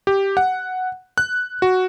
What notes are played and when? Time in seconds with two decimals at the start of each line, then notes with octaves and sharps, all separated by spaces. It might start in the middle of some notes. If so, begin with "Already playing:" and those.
0.07 G4
0.37 F#5
1.18 F#6
1.62 F#4